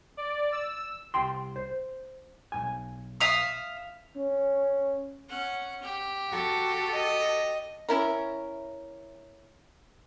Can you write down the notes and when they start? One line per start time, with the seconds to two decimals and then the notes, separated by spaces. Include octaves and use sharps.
0.17 D5
0.52 E6
1.14 C2 G5 C6
1.56 C5
2.52 B1 F#2 G#5
3.21 E5 F5 D#6
4.16 C#4
5.28 C#4 F#5
5.82 G4
6.28 F#4 A4
6.94 D#5
7.89 C#4 E4 A#4